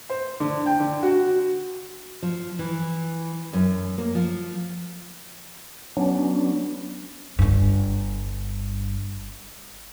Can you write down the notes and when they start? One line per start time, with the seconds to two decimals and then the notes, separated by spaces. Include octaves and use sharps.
0.09 C5
0.40 D3
0.66 G5
0.80 D3
1.03 F#4
2.22 F3
2.59 E3
3.53 F#2
3.98 A#3
4.15 F3
5.97 F#3 B3 C#4 D4
7.39 G1 G2